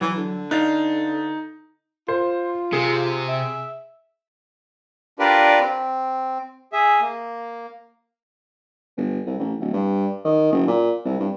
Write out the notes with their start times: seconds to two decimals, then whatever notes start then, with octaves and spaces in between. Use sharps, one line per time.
0.01 E3 F#3
0.17 D3
0.51 D#4 B4 D5 F5
2.08 F4 C5
2.73 C3 G#4
3.28 E5
5.19 D4 F4 G4 A#4 B4 D5
5.60 C4
6.73 G#4 E5
7.01 A#3
8.97 G1
9.26 C2
9.39 A1
9.60 D1
9.73 G2
10.25 D#3
10.52 F#1
10.67 A#2
11.05 C2
11.20 G2